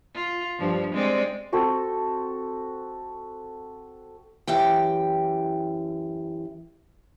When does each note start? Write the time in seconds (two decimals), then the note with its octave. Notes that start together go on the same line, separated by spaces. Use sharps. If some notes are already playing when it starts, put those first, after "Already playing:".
0.14 F4
0.59 G2 F3
0.94 G#3 C4 D5
1.52 C4 F#4 A4
4.47 F#2 E3 G4 G5